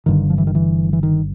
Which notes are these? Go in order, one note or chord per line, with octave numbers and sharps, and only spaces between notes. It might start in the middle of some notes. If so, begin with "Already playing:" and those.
G1 G2 D3 D#3
F3
E3
D#3
E3
E3
D#3